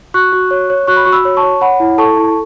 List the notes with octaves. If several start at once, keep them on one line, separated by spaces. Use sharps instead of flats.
F#4 C#6 F#6
F#4
C#5
C#5
F#4 C#6 F#6
B5
F#4 C#6
B5 E6
C#5
A5 C#6
C#5
C#5 F#5 B5
E4
A4 A5 C#6
E4